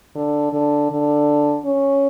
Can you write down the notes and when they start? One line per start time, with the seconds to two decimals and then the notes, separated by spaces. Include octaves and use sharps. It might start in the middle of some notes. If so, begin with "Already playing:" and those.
0.15 D3
0.53 D3
0.91 D3
1.65 C#4